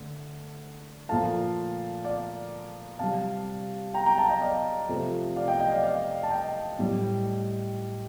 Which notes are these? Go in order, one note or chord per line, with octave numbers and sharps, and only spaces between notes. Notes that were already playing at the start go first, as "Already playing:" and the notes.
Already playing: D3 A3
A#2 F3 A3 F5 A5
D5 F5
C3 G3 F5 A5
G5 A#5
G5 A#5
F5 A5
D#5 G5
D5 F5
C3 F3 A3
D5 F5
D#5 G5
D#5 G5
D5 F5
D5 F5
A5
D#5 G5
A2 G3